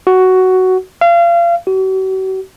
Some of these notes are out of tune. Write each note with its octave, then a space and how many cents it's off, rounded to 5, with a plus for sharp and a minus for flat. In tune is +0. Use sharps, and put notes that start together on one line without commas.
F#4 +10
F5 -30
F#4 +45